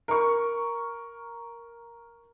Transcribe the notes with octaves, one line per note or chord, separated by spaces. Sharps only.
A#4 C#6